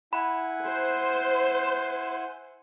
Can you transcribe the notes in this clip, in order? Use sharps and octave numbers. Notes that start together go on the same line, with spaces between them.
E4 F#5 G#5 B5
C5